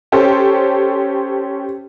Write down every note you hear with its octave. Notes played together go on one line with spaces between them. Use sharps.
C#4 G4 A4 C5